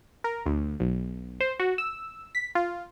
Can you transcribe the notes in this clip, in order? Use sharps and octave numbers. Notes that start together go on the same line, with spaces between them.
A#4
D2
B1
C5
F#4
E6
B6
F4